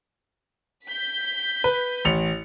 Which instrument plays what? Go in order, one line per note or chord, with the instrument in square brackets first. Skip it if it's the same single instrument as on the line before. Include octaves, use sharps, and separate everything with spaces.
[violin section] G6 B6
[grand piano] B4
A1 C#7 F7